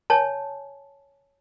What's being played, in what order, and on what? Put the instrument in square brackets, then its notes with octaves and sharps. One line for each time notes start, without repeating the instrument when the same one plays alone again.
[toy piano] C#5 G#5 A5